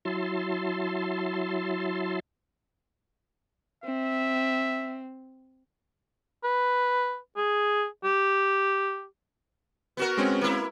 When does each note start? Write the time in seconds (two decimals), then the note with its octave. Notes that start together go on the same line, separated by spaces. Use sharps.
0.05 F#3 E4 A5 C6
3.84 C4 E5
6.44 B4
7.37 G#4
8.04 G4
9.97 B3 F#4 A#4
10.17 G#3 C4 C#4
10.41 A#3 E4